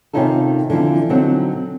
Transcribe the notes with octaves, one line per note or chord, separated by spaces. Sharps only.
C3 D#3 C#4 D#4 F4 A4
D3 E3 F3 C4
B2 D3 F#3 C4 D#4